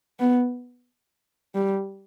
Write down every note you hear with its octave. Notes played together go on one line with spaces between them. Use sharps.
B3
G3